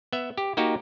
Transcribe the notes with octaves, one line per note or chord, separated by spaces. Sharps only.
B3 E5
G4
A#3 D#4 F#4 G4